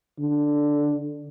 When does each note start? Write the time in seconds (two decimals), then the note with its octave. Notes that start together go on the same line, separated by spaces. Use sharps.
0.19 D3